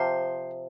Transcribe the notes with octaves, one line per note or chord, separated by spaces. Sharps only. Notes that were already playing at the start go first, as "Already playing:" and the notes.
Already playing: C3 F3 C5